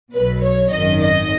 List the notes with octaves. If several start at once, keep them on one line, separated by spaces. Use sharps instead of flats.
B1 B2 F#3 B4
C#5
G#1 F#2 D#3 F#3 D#5
D#5